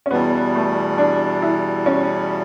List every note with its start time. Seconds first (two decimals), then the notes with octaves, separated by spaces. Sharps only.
0.06 C#4
0.11 E2 B2 G3 B3
0.55 A3
0.98 D4
1.42 E4
1.86 C#4